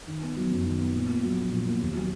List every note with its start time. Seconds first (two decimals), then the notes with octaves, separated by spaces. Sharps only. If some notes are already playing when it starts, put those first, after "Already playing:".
0.07 D#3
0.21 B3
0.37 F#3
0.51 F#2
0.65 D#3
0.79 B3
0.94 A#2
1.08 A#3
1.23 F#3
1.38 A#1
1.52 A#2
1.65 A#3
1.81 D#2
1.95 F#3